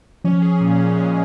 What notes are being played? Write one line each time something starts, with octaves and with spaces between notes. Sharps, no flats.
F3 C#4
G#4
A#2
A#2
G#3